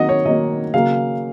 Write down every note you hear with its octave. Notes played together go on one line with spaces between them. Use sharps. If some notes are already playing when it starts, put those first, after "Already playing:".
Already playing: D#3 F#3 A#3 D#5 F#5
C#5
D#3 F#3 A#3 D#5
C#3 F#3 A#3 F5